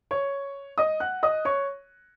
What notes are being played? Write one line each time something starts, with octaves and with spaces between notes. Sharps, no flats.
C#5 C#6
D#5 D#6
F#5 F#6
D#5 D#6
C#5 C#6